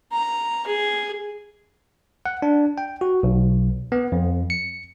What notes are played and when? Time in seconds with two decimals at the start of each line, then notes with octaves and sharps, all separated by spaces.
0.12 A#5
0.67 G#4
2.26 F#5
2.42 D4
2.78 G5
3.01 F#4
3.23 B1
3.92 B3
4.12 F2
4.50 C#7